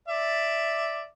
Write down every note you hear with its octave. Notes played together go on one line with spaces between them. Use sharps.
D5 E5